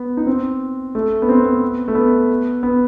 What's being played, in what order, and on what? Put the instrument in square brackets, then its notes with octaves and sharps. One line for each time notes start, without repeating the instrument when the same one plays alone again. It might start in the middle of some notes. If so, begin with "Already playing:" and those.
Already playing: [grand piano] B3
D#4
C4
A3
B3
C4
B3
A3
B3
B3